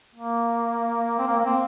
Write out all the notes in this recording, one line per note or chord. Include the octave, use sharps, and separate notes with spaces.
A#3
C4
A#3
A#3
C4